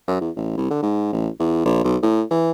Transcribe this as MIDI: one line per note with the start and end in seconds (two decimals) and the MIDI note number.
0.08 0.19 42
0.21 0.30 40
0.36 0.56 33
0.57 0.68 36
0.70 0.78 50
0.83 1.11 44
1.13 1.29 33
1.39 1.62 40
1.65 1.81 34
1.84 1.96 35
2.03 2.22 45
2.31 2.52 52